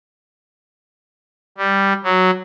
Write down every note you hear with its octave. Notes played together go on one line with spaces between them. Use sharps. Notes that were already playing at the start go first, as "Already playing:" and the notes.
G3
F#3